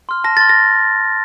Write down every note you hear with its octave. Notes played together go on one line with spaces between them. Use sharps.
C6 F6
A5 A#6
C6 F6 A6
A#6